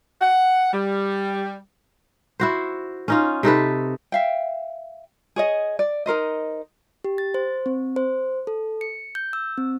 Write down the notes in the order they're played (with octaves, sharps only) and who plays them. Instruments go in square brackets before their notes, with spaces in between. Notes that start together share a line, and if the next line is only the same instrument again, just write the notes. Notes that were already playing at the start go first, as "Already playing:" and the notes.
[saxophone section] F#5
G3
[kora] E4 F#4 C5
C#4 D#4 F4
C3 D#4 A4 B4
[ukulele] E5 F5 G5
G#4 C#5 D#5
D5
D#4 A#4 C5 D#5
[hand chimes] G4
A6
C5
C4
C5
A4
C#7
G6
E6
C4